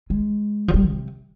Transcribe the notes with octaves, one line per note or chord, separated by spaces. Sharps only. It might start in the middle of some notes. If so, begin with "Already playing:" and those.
G#3
F3
G3
C3